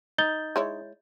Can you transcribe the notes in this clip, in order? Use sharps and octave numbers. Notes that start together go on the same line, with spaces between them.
D#4 G6 A6 G7
G#3 E4 C#5